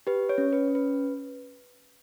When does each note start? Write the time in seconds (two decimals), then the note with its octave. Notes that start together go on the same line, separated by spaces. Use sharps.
0.07 G4 B4
0.29 C#5
0.38 C#4
0.53 B4
0.68 C#4
0.75 B4